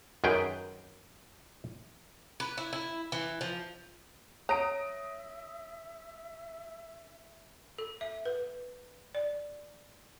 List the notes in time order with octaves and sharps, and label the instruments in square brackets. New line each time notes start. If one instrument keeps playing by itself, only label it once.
[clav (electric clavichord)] F#2 D#3 G#4 B4 G5
[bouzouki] B4
E4
E4
E3
F3
[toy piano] C#5 [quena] E5 [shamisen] A#5 [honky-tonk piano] D#6 A#6 D7
[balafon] A4
E5
B4
D5